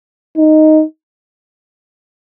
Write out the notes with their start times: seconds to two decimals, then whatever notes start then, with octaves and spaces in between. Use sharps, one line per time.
0.37 D#4